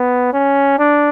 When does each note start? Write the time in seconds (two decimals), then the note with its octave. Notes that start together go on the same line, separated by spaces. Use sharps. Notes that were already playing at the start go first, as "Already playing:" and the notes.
Already playing: B3
0.33 C#4
0.79 D4